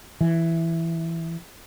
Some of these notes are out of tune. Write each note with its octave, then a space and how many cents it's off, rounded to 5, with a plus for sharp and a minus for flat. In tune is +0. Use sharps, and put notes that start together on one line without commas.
E3 +5